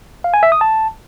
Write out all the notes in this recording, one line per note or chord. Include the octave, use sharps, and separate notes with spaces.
F5
G#5
E5
D#6
A5